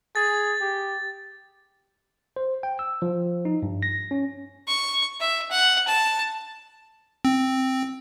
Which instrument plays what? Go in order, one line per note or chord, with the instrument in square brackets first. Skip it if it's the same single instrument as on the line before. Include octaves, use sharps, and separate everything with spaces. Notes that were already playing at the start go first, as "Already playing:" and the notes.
[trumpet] G#4 [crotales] A6
[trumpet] G4
[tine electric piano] C5
G5
E6
F3
D#4
G2
A#6
C#4
[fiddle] C#6
E5
F#5
A5
[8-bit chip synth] C4